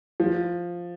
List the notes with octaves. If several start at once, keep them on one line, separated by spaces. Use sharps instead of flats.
F3